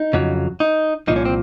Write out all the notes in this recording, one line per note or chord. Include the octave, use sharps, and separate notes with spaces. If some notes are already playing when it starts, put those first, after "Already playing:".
Already playing: D#4
F2 C#3 F#3
D#4
C2 A#2 F3 D#4
C#4
C4